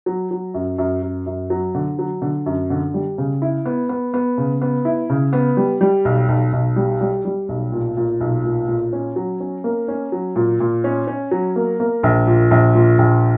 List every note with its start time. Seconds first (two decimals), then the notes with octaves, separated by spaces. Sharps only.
0.06 F#3
0.31 F#3
0.54 F#2
0.78 F#2
1.02 F#2
1.26 F#2
1.50 F#3
1.75 D3
1.99 F#3
2.22 D3
2.46 F#2
2.70 D3
2.94 G3
3.18 C#3
3.42 E4
3.65 B3
3.89 B3
4.14 B3
4.38 C#3
4.62 B3
4.85 E4
5.10 C#3
5.33 B3
5.57 G3
5.81 G3
6.05 B1
6.29 B1
6.53 B1
6.76 G3
7.01 G3
7.25 G3
7.49 B1
7.72 A#2
7.97 A#2
8.21 B1
8.44 A#2
8.68 A#2
8.93 C#4
9.16 F#3
9.40 C#4
9.64 A#3
9.88 C#4
10.12 F#3
10.36 A#2
10.60 A#2
10.84 C#4
11.07 C#4
11.31 F#3
11.56 A#3
11.80 A#3
12.03 A#1
12.27 A#2
12.51 A#1
12.75 A#2
12.99 A#1